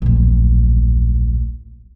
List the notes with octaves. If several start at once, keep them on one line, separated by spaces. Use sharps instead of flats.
D1 A#1